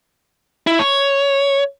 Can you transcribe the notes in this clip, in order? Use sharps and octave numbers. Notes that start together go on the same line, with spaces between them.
E4
C#5